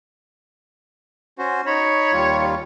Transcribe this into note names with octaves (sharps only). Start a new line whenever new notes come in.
C#4 F#4 C5
D#4 C#5 B5
D#2 G3 F4